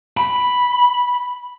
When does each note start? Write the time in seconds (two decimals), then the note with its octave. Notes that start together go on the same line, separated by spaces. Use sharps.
0.17 B5